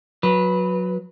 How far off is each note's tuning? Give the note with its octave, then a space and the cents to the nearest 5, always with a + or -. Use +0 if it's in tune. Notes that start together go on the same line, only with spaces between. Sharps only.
F#3 -20 B4 -10